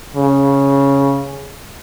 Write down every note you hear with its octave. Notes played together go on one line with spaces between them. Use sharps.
C#3